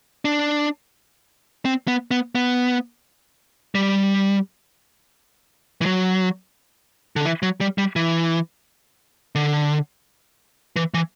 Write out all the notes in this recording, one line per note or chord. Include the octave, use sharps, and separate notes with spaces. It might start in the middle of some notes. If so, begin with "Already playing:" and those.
D4
C4
B3
B3
B3
G3
E3
F#3
D3
E3
F#3
G3
G3
E3
D3
E3
E3